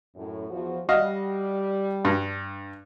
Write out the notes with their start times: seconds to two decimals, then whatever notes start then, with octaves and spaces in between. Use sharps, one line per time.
0.16 F#2 A2
0.50 E2 F3 F#4
0.89 G3 F#4 D#5 F5
2.05 G2